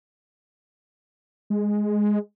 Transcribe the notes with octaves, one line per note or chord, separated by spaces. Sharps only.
G#3